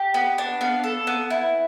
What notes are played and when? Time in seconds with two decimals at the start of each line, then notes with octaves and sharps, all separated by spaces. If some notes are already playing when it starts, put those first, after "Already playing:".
Already playing: G4
0.14 B3
0.38 D4
0.61 B3 F5
0.84 A4
1.07 B3
1.30 E4